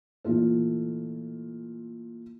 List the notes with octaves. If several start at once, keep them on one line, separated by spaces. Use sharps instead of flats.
A#2 E3 A3 F4 A4